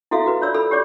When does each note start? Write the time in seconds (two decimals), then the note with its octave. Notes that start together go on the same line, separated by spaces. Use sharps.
0.11 E4 F#4 A4 E5 F5
0.26 F#4 B4
0.41 F4 C#5 D5 E6
0.54 A4 B5 E6
0.71 G4 C#5 D5 D6